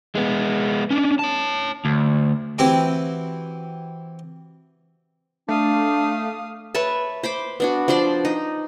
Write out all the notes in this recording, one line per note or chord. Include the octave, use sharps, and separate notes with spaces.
G#3 B3
C#4 D4
C#5 A5
D2
E3 C4 E4 F#4 G4
A3 D4 F5 D#6
B4 C#5 E5 A5
C5 B5 D6
B3 D4 F#4
F3 D4 C5 D5
D#4